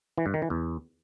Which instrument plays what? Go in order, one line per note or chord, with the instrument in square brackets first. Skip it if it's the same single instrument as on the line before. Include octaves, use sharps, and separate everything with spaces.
[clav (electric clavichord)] E3
G2
D#3
E3
E2